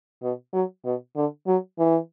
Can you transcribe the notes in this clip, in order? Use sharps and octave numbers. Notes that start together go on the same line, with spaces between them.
B2
F#3
B2
D3
F#3
E3